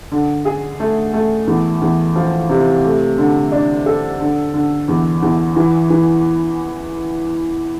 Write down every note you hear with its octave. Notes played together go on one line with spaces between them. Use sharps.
D3
G#4
A3
A3
E2
E2
F3
C3
A3
D3
D4
A4
D3
D3
E2
E2
E3
E3